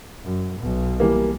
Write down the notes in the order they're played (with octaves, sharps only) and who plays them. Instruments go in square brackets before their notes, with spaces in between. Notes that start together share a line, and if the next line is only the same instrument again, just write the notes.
[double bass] F#2
B1 B2
[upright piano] E3 G3 A#3